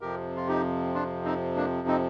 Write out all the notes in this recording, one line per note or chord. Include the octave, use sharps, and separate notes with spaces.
F2 C3 F3 G4 A#4
F4
D#4 G4
D4 F4
C4 D#4
A#3 D4
C4 D#4